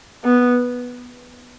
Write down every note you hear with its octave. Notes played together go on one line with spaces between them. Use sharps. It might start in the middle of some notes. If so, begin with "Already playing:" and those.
B3